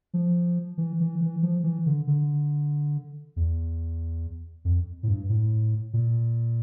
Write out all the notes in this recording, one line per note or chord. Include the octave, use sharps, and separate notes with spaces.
F3
E3
E3
E3
F3
E3
D3
D3
E2
F2
A2
G2
A2
A#2